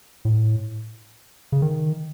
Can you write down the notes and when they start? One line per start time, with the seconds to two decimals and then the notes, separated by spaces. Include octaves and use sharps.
0.25 A2
1.52 C#3
1.62 D#3